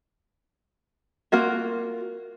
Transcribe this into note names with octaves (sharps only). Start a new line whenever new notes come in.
A#3 F4 F#4 A#4